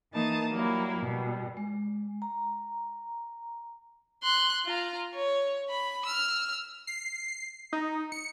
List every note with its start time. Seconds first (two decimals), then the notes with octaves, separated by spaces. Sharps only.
0.12 E3 A#3 D#4 A5 D#6
0.51 F#3 G3 A#3 E4
0.98 B2 G3
1.57 G#3
2.22 A#5
4.23 C6 F#6
4.66 F4 A#5
5.15 C#5
5.70 B5
6.06 E6 F6
6.87 C7
7.73 D#4
8.12 C#7